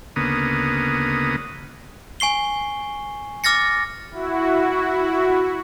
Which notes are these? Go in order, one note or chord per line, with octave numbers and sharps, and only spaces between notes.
D2 C#3 A#3 B3 D#6
G#5 C#6 C7 G7
D6 F6 A6 A#6 C#7
E4 F#4